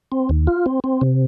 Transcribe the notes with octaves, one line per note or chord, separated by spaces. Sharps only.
C4
D#2
F4
C4
C4
C3